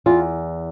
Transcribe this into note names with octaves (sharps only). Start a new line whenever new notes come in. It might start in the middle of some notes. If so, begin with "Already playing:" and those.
E2 F4